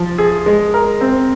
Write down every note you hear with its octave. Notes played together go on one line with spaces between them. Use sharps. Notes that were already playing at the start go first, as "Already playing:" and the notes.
Already playing: F3
G#4
G#3
A#4
C4